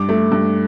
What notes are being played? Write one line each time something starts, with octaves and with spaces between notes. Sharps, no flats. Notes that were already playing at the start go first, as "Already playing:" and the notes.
Already playing: G2 D6
A3
G2